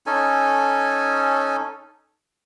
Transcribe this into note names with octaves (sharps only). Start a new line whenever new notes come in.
C#4 D#4 A4 G#5